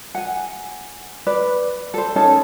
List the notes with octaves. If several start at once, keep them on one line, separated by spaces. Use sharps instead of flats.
F#5 G#5
B4 D5
A4 C5
C#4 D#4 A4